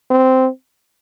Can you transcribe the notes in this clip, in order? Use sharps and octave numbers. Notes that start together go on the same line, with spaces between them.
C4